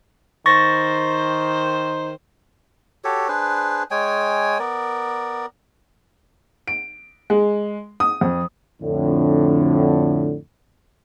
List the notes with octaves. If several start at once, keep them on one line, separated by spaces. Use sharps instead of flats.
D#3 C5 C#6 A6 A#6
F#4 G4 A4 C#5
D4 G#4 B4 C5
G#3 C#5 G5 G#5
B3 A#4 D5
D7
G#3
D#6
F2
F2 A2 D3